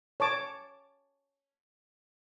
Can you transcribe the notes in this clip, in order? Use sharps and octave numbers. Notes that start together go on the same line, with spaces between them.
C#5 A5 D6